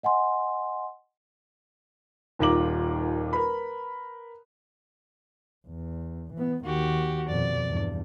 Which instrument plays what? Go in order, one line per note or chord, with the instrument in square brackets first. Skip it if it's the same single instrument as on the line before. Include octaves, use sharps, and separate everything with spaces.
[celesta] D#5 F#5 G#5 C6
[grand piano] D#1 D#2 F4 A#5 D6 F#7
A#4 B4 B5
[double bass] E2
E3 B3
[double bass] D#2 D#3 [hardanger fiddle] F#4 G4
[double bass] F2 B2 [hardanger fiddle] D5
[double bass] E2 G2